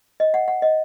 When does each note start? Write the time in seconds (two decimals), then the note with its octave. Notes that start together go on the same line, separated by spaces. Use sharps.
0.20 D#5
0.34 F#5
0.48 F#5
0.62 D#5